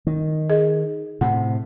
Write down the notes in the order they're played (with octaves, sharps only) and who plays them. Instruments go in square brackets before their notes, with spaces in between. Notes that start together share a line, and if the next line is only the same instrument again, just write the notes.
[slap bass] D#3
[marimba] G#4 D#5
[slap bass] A2 C3 [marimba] F#5